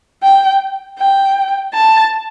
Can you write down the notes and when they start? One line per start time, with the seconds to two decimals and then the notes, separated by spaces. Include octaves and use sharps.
0.23 G5
0.99 G5
1.74 A5